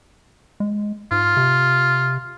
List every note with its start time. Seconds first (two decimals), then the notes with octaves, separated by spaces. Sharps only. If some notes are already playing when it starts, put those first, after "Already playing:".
0.60 G#3
1.11 G#2 F4
1.37 C3